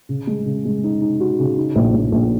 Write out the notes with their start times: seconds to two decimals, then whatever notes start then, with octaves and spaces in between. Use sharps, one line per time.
0.09 C#3
0.27 G#3
0.46 C#3
0.65 G#3
0.84 D#4
1.01 D#4
1.20 F#4
1.39 C#3
1.58 D#4
1.76 A#1
1.94 A#1
2.12 A#1